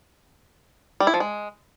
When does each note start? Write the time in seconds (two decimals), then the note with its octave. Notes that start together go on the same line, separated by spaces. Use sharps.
1.00 G3
1.07 E4
1.14 F3
1.20 G#3